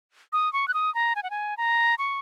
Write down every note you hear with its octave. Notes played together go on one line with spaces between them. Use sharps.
D#6
C#6
F#6
D#6
A#5
G#5
F#5
G#5
A#5
C#6